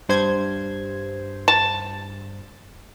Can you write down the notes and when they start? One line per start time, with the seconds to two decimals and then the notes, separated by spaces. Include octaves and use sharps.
0.09 G2 C5 G#6
1.48 A5